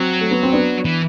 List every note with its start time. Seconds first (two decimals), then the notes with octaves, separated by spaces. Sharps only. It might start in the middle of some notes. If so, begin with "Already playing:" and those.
Already playing: F#3 C4
0.21 A3
0.31 B3
0.43 C4
0.53 B3 D4
0.85 E3